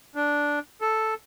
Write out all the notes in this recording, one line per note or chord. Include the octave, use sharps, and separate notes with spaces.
D4
A4